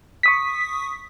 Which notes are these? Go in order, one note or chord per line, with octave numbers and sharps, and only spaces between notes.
C#6 D#6 B6